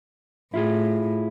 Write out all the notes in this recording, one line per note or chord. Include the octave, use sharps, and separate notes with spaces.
A2 E4 F4 G#4